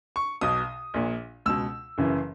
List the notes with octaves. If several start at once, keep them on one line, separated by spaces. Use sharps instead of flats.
C#6
B1 B2 D#6
A#1 A#2
C#2 B2 E6
F#1 F#2 C#3 E3